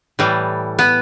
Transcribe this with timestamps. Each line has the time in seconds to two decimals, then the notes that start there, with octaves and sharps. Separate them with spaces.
0.19 A2 E3 G3
0.79 B3